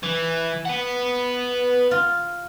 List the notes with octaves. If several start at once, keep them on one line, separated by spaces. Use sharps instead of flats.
E3
B4 F#5
F4